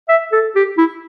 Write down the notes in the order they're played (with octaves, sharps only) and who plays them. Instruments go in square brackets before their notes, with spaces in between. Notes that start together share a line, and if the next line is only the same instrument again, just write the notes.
[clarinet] E5
A4
G4
E4